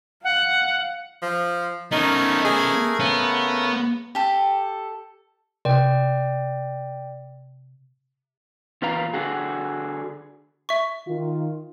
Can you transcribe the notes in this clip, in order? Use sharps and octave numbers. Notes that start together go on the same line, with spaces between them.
F5 F#5
F3
A3 B3 C#4 D#4 A#4
G#4
C#3 B3 B4
G4 A4
C3 D5 G5
E2 A#2 F4 B4 F5 A#5
D3 F#4 G#4
E5 C#6
D#3 F4